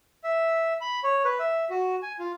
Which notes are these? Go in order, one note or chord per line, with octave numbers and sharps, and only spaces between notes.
E5
B5
C#5
B4
E5
F#4
G#5
F4